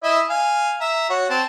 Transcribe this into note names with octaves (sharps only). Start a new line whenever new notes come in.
E4 D#5 E5
F5 G#5
E5 A#5
F#4 C#5
C4 A5